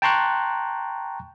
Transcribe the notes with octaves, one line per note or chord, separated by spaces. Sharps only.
G5 A5 A#5 C6 C#6 F#6